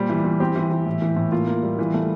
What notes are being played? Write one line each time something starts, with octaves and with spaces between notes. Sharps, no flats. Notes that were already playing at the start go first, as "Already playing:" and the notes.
Already playing: A#2 G3 C5
E3
E3
C4 G4
E3
E3
A2
E3
A2
A#3 F4
A#3
G3
E3
A3